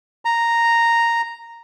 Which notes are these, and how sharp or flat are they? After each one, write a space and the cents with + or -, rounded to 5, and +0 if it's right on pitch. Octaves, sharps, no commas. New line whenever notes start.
A#5 -5